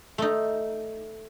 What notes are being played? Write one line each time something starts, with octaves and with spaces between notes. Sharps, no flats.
A3 D#4